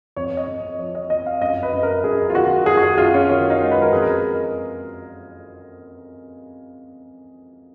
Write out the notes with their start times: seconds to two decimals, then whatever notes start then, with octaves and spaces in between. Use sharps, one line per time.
0.16 F2 C#5
0.37 D#5
0.48 F2
0.79 F3 C#5
0.95 D#5
1.10 F2 D#5
1.26 F5
1.41 F#2 D#5
1.63 B4
1.73 F#2
1.83 A#4
2.04 F#2 G#4
2.30 F4
2.35 D#3 F#4
2.66 F#2 G#4
2.77 F#4
2.83 G#4
2.98 F#2 F4
3.14 C#4
3.29 D#3 C#4
3.50 D#4
3.61 G#3
3.72 B4
3.82 A#4
3.92 F2 G#4
4.02 A#4